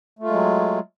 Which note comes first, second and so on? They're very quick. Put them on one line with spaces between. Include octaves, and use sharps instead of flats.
A3 F4 G#3 F#3